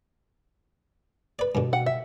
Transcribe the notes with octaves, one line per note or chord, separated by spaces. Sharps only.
B4 D5
G2 B2 D3
F#5
E5